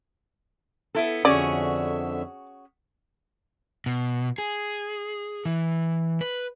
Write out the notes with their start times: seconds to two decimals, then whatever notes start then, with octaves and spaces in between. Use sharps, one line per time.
0.95 B3 E4 A4
1.25 F2 D3 C#4 F#4 G#4 D5 E5
3.86 B2
4.38 G#4
5.46 E3
6.21 B4